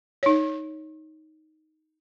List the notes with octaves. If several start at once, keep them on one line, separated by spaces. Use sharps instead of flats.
D#4 C#5